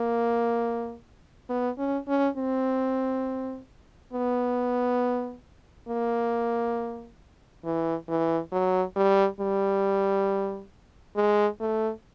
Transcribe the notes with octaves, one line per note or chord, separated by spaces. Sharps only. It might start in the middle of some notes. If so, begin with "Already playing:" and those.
Already playing: A#3
B3
C#4
C#4
C4
B3
A#3
E3
E3
F#3
G3
G3
G#3
A3